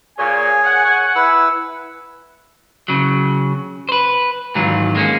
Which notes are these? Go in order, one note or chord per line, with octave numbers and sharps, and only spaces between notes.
A#2 G#4 C#5 G#5
F#5
E4 B4 E6
C#3 F#3
B4 C5
G#2 D#3 E3 F#3 F4
G#3 A#3 C#4